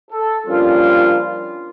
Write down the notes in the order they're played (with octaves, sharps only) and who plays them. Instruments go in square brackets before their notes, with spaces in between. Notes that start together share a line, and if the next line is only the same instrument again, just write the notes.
[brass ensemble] A4
F3 G3 A#3 C#4 D4 F4